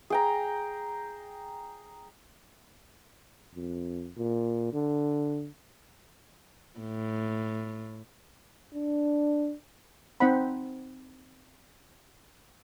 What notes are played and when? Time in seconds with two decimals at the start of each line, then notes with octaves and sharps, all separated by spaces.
0.10 G#4 G5 A#5
3.55 F2
4.17 A#2
4.73 D3
6.80 A2
8.74 D4
10.20 C4 D#4 C5 D#5 F#5 B5